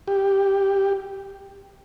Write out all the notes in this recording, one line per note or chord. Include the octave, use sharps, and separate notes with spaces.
G4